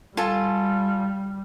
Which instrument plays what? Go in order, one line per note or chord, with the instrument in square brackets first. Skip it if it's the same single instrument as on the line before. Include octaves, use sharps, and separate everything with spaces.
[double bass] G3 [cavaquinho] F4 A4 G#5